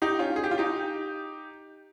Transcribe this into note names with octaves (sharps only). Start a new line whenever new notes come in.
D#4 G4
C#4 F4
G#4
G4
F4
D#4 G4